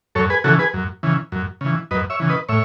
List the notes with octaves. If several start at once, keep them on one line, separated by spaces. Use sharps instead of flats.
F#2 A4 C#5
G#4 B4
C#3 E3 F#4 A4
G#4 B4
F#2
C#3 E3
F#2
C#3 E3
F#2 B4 D#5
C#5 E5
C#3 E3
B4 D#5
A2 C#5 E5